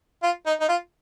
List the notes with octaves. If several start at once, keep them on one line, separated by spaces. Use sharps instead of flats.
F4
D#4
D#4
F4